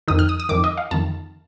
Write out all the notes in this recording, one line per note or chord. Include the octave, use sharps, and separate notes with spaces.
F2 D#3 D#6
F6
D#6
D#6
F2 D#3 D6
D#5
F5
F2 D#3 A5